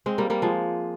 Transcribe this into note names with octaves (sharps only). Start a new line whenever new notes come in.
G#3 C4
G3 A#3
G3 A#3
F3 G#3